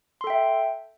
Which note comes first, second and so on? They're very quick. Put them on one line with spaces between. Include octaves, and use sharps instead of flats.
C6 A4 G5 E5